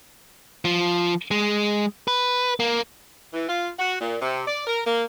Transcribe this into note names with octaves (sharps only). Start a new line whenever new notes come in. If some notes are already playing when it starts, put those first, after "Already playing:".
F3
G#3
B4
A#3
E3
F4
F#4
A#2
C3
D5
A#4
A#3